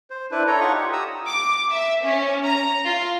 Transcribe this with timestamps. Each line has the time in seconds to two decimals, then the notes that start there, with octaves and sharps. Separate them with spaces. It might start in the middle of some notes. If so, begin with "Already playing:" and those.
0.10 C5
0.31 D4 E4 B4
0.47 A4 C#5 A#5
0.60 D#4 F4 F#5 C#6
0.73 G4
0.93 A#5 D#6 E6
1.29 D6
1.72 E5
2.05 C#4
2.45 A#5
2.86 F4